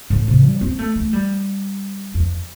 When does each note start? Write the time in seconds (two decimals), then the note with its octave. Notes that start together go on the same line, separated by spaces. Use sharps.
0.10 A2
0.28 C3
0.45 G3
0.61 C4
0.79 A3
0.96 A3
1.13 G3
2.14 F2